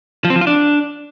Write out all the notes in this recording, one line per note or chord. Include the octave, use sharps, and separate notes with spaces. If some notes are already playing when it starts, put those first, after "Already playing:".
F3
C4
F3
F4
D4